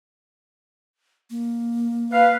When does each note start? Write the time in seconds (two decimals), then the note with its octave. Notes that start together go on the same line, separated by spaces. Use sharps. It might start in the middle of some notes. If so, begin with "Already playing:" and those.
1.31 A#3
2.12 B4 F5